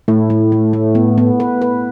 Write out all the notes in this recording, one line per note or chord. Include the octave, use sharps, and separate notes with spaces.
A2 E4
A3
A3
A3
B3
B3
B4
B4